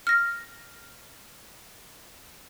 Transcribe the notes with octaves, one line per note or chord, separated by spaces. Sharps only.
F6 A#6